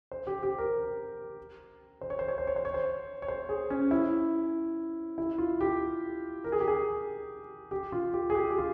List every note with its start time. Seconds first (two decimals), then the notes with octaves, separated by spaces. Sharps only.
0.11 C5
0.27 G4
0.43 G4
0.58 A#4
2.01 C5
2.10 C#5
2.19 C5
2.28 C#5
2.38 C5
2.47 C#5
2.56 C5
2.65 C#5
2.74 C5
3.22 C#5
3.28 C5
3.49 G#4
3.70 C#4
3.91 E4
5.18 E4
5.38 F4
5.61 G4
6.44 A#4
6.52 G#4
6.60 G4
6.68 G#4
7.71 G4
7.92 F4
8.14 G4
8.30 G#4
8.35 G4
8.51 G4
8.58 F4